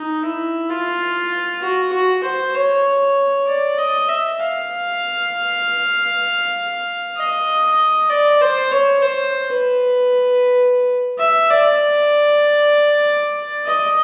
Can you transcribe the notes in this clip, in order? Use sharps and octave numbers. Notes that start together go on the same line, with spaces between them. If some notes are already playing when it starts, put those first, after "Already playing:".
Already playing: D#4
E4
F4
F#4
F#4
C5
C#5
D5
D#5
E5
F5
D#5
D5
C5
C#5
C5
B4
E5
D5
D#5